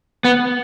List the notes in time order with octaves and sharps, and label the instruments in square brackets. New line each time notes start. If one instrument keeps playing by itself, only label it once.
[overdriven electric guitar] B3